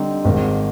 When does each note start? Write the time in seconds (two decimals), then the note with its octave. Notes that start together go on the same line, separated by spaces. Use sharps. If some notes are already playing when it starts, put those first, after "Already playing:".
Already playing: D3 G3 C4 D#4 G4
0.24 G#1 G#2 D#3